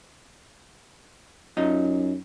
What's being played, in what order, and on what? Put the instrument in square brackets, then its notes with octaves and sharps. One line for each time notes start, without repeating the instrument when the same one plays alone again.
[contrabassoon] F#2 [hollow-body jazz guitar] D#4 F4 D#5